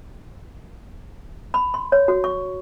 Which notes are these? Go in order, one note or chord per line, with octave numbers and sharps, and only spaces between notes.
B5
C6
C#5
F#4
C#6